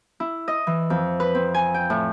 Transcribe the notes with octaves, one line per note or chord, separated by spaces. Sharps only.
E4
D#5
E3
F2
B4
C4
G#5
G5
A2